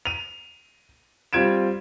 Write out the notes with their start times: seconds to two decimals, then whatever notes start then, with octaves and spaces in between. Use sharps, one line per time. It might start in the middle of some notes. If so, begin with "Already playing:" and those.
0.05 D#7 F7
1.33 G3 C4 F4 G#6 D7 E7